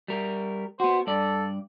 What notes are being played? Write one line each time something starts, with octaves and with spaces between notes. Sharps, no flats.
G3 A#4
B3 F#4 C5
G2 A4 D5